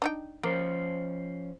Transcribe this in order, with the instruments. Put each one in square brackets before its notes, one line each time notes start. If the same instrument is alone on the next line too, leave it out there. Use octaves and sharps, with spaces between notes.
[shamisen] D4 D#4 G5
[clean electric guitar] F3 C#4 C5 [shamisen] A#3